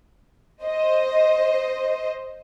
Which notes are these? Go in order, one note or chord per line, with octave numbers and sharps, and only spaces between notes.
C5 D#5